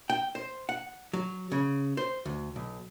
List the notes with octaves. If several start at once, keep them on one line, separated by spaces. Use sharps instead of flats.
G5
C5
F#5
F#3
C#3
C5
D2
B1